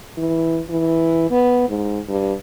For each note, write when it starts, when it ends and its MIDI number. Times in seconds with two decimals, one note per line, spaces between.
0.17 0.60 52
0.69 1.27 52
1.31 1.64 59
1.69 2.00 44
2.08 2.33 43